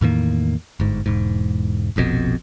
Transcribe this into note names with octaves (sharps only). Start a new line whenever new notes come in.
E2 A2 D#3 A#3
G1 G#2
E1 G#2
F1 A#1 F2 B2